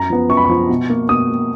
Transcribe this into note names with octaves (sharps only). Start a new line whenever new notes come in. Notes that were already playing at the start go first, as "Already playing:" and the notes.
Already playing: F#2 A#5
F3 B3
F#2 C#6
B5
F3 B3 C#6
B2
A#3
B2 D#6
A#3